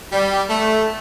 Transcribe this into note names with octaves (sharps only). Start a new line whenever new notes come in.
G3
A3